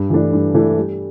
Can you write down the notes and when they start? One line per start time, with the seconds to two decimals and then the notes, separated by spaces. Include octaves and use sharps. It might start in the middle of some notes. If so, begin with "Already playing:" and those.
Already playing: G2
0.10 E3 A3 D4
0.33 G2
0.54 E3 A3 D4
0.76 G3